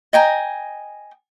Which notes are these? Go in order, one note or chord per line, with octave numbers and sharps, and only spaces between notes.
D#5 G5 G#5 A#5